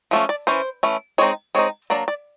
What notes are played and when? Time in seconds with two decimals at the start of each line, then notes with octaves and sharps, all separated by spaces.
0.11 F3 A3 C#4
0.29 D5
0.47 E3 A3 C#4 C5
0.83 E3 A3 C#4
1.18 G#3 C4 D#4 C#5
1.55 G#3 C4 D#4 C#5
1.90 F#3 A#3 D4 D5
2.08 D5